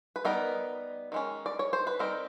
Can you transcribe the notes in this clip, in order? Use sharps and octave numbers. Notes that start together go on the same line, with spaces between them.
B4
G3 B3 D#4 A#4
D#3 G#3 C#4
D5
C#5
C5
B4
G3 C4 D#4 A#4